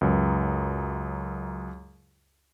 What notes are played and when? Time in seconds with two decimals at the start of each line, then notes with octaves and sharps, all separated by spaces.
0.01 C#2 F#2